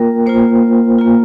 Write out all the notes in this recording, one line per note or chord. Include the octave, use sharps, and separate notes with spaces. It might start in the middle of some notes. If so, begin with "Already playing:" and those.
Already playing: A#3 F4 A#4 G5
A#3 F4 C5
A#3 F4